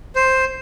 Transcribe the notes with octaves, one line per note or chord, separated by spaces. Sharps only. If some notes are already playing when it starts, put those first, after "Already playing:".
C5